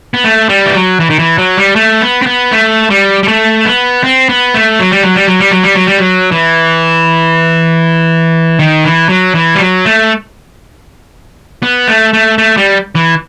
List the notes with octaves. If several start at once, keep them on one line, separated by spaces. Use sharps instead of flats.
B3
A3
G3
E3
F#3
E3
D#3
E3
F#3
G3
A3
B3
C4
B3
A3
G3
G3
A3
B3
C4
B3
A3
F#3
G3
F#3
G3
F#3
G3
F#3
G3
F#3
G3
F#3
E3
D#3
E3
F#3
E3
G3
F#3
A3
B3
A3
A3
A3
G3
E3